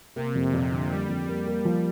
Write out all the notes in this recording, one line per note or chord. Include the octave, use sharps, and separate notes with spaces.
C3 A#3
F2
F2 A#2
D3
G3 A#3
F2
G3 A#3
A#3
F3